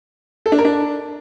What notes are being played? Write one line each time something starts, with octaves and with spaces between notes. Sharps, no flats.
A4
D4
A#4
D4